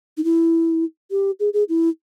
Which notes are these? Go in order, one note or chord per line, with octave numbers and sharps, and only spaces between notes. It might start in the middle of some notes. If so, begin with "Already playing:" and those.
D#4
E4
G4
G#4
G#4
E4